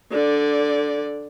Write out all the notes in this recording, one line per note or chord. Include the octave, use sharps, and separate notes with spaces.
D3 D5